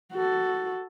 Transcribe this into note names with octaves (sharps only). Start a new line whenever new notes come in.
F#4 A4